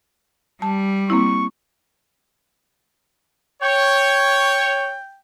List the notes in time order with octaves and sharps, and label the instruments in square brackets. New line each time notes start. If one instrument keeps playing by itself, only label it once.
[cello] G3 [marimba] A5
[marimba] A#3 C4 E4 [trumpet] C#6
[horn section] C#5 [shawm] G5